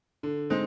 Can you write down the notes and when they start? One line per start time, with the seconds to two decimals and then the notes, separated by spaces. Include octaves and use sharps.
0.23 D3
0.50 G#3 C4 D#4